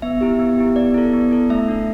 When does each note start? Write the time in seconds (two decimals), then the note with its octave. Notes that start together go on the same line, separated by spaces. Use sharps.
0.02 B3 E5
0.21 E4 G4
0.39 B3
0.58 E4 G4
0.76 B3 D5
0.94 E4 A4
1.13 B3
1.31 E4 A4
1.50 A3 E5
1.68 D4 A4